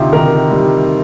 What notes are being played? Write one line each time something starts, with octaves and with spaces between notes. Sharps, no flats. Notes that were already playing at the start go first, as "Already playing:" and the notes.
Already playing: D2 C3 D4 D#4 F4 G4
D#3 A#4
G3